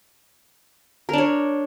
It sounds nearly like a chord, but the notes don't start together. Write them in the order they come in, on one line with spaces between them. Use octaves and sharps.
A#4 D4 C#5